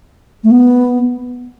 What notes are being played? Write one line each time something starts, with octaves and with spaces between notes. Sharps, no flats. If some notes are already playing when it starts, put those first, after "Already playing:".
A3
B3